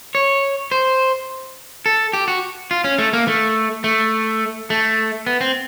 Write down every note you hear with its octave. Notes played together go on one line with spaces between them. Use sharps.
C#5
C5
A4
G4
F#4
F4
C#4
A3
A#3
A3
A3
A3
B3
C4